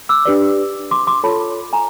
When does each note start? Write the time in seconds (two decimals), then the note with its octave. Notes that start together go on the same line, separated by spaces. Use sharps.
0.09 D6 E6
0.25 D4 G4 B4 D5
0.91 C6 D6
1.07 C6 D6
1.24 F4 A4 C#5 A5 B5
1.73 G#5 A#5